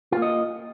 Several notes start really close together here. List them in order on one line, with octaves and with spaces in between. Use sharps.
F4 A#3 D#5